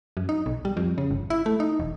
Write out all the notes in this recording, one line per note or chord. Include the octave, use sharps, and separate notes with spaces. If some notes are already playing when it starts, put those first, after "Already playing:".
F#2
D#4
B1
G3
F2
C#3
G1
E4
A3
D#4
E1